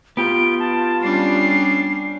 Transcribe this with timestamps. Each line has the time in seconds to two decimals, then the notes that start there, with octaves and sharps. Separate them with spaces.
0.17 B3 F4 G4 D7
0.60 A5
1.02 G3 C#4 D4 C7